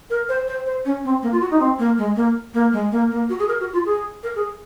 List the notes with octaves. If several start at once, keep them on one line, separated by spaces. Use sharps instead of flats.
A#4
C5
C5
C5
C#4
C4
A#3
F4
F#4
D#4
C4
A#3
G#3
A#3
A#3
G#3
A#3
A#3
F#4
G#4
A#4
F#4
F4
G#4
A#4
G#4